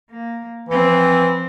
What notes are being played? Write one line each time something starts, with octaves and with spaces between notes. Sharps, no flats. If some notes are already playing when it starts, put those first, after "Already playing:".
A#3
E3 F3 C4